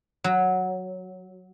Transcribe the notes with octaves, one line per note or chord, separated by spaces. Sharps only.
F#3